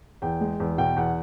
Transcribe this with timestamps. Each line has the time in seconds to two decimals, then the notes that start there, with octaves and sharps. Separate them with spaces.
0.22 E2 G5
0.41 G#3
0.60 E2
0.78 B2 G5
0.96 E2 F#5